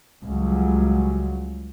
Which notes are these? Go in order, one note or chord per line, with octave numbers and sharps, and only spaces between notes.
C#2 C#3 F#3 G3